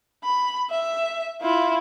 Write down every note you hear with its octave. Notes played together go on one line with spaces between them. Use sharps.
B5
E5
E4 F4